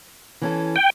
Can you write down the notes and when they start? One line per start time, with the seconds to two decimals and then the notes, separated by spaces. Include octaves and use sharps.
0.41 E3 C#4 A4
0.76 G5